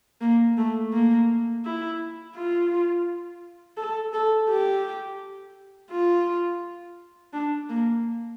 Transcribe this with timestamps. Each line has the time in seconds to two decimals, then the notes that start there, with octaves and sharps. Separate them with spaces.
0.21 A#3
0.58 A3
0.93 A#3
1.65 E4
2.36 F4
3.77 A4
4.13 A4
4.49 G4
5.91 F4
7.33 D4
7.69 A#3